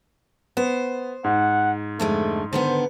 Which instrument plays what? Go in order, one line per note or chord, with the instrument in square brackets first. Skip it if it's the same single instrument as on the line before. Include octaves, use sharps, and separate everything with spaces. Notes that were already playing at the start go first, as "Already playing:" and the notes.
[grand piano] B3 [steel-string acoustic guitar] C5
[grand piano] G#2 [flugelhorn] F#5
[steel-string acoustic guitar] F2 D3 G#3 [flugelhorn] A3
[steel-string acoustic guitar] D3 D#3 B3 [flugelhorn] C5